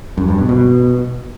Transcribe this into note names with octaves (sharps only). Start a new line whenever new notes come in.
F#2
G2
B2
B2